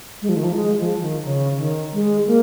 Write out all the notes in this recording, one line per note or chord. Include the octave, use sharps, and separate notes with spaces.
G#3
F3
D#3
F3
G#3
F3
D#3
C#3
D#3
G#3
A#3